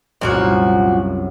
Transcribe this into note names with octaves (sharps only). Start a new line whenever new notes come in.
C2 F#2 A#2 F3 F#4